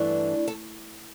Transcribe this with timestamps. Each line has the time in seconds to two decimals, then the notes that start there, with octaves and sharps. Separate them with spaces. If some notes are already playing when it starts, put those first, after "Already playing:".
Already playing: G2 E3 A3 D4
0.48 A4